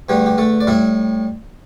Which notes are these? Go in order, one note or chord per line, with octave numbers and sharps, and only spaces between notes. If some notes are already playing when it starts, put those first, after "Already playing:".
E2 D3 G3 A3 G4
G4
A3 A4
D5
A2 G3 E4 E5